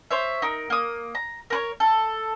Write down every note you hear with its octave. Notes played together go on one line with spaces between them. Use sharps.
C5 C#5 E5
D#4 A#4
A#3 D#6
A#5
A#4 B4 C#5
A4